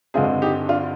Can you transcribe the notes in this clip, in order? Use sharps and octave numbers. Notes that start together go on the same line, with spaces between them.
G2 D3 G#3 C4 F4 G#4
D#4 G4
D4 F4